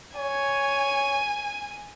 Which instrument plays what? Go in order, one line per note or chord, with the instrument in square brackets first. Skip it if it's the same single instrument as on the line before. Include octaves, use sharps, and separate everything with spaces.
[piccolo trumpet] C#5 [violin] G#5